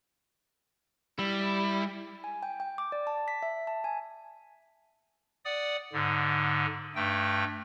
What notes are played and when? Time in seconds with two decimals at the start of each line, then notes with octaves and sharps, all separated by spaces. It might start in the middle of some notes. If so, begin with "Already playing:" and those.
1.19 G3 E4
2.24 G#5
2.43 G5
2.60 G5
2.78 D6
2.92 D5
3.07 A5
3.28 B6
3.43 E5
3.67 A5
3.84 G#5
5.45 D5 F#5 D#6
5.93 G#2 D3
6.95 G2 A3 G5